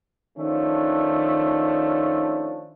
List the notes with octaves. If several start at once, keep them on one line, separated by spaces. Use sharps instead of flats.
D#3 F3 A3 C#4 D4